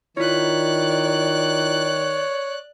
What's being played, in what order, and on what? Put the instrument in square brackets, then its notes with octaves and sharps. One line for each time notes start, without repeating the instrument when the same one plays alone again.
[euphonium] D#3 [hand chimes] E4 F4 [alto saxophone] C#5 [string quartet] D5 F#6